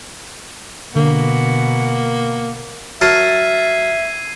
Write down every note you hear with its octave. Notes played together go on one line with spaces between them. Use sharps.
B2 D3 A#3 F#5
F#3 A#4 E5 A5 G#6 C7 D#7